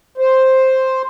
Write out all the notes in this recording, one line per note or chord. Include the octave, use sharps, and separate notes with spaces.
C5